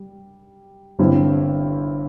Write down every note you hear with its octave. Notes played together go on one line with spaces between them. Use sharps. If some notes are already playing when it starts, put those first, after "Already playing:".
Already playing: G3
G1 G2 G3 C4 E4